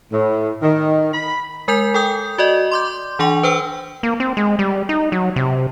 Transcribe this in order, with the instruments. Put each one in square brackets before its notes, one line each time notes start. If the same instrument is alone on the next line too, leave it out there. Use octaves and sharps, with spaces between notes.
[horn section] A2
D#3
B5
[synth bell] G#3 A#4 G#5 G6 B6 F7
A4 G5 D#6 G6
F#4 D5 D#5
C6 D6 G6
E3 D4 F#5 G#5 C#6 F7
B4 C5 G5 E6
[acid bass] A#3
C4
G#3
G3
D#4
F#3
C3